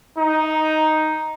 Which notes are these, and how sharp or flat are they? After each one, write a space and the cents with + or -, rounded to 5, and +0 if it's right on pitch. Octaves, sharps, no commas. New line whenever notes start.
D#4 +5